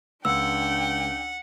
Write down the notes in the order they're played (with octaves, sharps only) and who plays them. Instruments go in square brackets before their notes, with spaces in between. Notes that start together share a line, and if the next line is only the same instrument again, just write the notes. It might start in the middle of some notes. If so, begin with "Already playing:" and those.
[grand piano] C#2 [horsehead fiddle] D4 G5 [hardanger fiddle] F#5 [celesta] E6